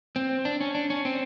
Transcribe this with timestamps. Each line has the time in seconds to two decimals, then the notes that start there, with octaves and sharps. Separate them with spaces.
0.16 C4
0.45 D4
0.61 C#4
0.75 D4
0.90 C#4
1.05 C4